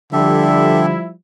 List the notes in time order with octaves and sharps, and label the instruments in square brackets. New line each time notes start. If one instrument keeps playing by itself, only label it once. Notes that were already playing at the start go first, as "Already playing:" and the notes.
[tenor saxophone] D3 [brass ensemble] F3 G3 E4 [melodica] G4 A4 E5